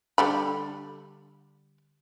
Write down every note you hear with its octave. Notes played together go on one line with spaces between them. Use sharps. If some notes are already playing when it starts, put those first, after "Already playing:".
D3 G3 B5